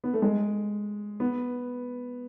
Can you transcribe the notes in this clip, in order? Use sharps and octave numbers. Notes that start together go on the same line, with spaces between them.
B3
A3
G#3
B3